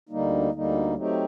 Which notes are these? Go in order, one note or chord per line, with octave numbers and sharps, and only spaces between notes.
D2 D3 G3 A#3 D#4
D2 D3 G3 A#3 D#4
F#3 A3 C4 D#4 G4